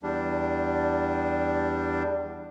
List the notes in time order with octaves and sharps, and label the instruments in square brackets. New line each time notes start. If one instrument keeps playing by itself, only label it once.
[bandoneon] E2 G3 D4